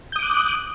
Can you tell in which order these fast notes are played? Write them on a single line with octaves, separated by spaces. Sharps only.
G6 D#6 D6 F#6